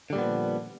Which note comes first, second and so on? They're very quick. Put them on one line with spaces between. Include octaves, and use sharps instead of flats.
D3 G3 A#2 B3 F3